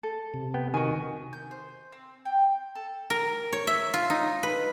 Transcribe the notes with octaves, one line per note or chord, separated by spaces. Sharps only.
A4
C3
B3 G5
D#3 F#4 G#5
G6
C5
C4
G5
A4
A#4
C#5
E5
F4
D#4
B4